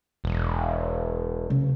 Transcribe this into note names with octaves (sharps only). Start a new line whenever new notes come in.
E1
C#3